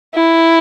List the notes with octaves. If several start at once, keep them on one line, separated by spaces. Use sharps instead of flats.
E4